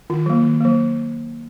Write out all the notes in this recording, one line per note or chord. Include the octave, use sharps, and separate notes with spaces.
D#3 F4
F#3 A#3
D#3
F#3 A#3